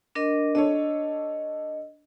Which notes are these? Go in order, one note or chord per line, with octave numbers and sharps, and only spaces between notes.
D4 A#4 D#5
D4 A4 C#5 D#5